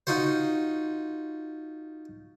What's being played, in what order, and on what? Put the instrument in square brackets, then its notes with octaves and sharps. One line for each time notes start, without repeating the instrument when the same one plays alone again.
[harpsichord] D#4 F4 F#4 C5